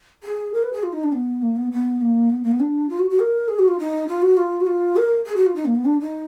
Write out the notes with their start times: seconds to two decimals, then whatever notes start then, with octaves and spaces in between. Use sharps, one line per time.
0.23 G#4
0.54 A#4
0.63 B4
0.73 G#4
0.83 F4
0.93 D#4
1.03 D4
1.12 B3
1.42 A#3
1.56 B3
1.71 B3
2.01 A#3
2.30 B3
2.43 A#3
2.52 B3
2.61 D4
2.89 F4
2.99 F#4
3.10 F#4
3.20 A#4
3.48 G#4
3.59 F#4
3.68 F4
3.79 D#4
4.08 F4
4.22 F#4
4.37 F4
4.60 F#4
4.67 F4
4.97 A#4
5.26 G#4
5.36 F#4
5.46 F4
5.55 D#4
5.65 A#3
5.75 B3
5.85 D4
6.00 D#4